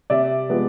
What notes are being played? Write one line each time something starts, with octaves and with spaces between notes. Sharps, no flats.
C3 D5 E5
F3 G#3 B3